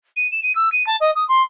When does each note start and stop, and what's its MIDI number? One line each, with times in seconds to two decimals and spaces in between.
0.16 0.30 99
0.32 0.41 100
0.43 0.55 99
0.55 0.71 88
0.72 0.86 99
0.87 0.97 81
1.00 1.11 75
1.15 1.27 87
1.28 1.42 84